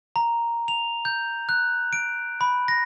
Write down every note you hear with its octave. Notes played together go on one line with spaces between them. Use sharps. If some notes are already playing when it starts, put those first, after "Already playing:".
A#5
F7
G6
F#6
D7
B5
A#6